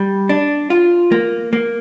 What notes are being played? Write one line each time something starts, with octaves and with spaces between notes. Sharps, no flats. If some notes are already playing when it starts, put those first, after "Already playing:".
Already playing: G3
D4
F4
A#3
A#3